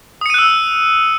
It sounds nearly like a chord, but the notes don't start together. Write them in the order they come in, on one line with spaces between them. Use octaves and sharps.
D#6 C#7 D#7 F#6 E6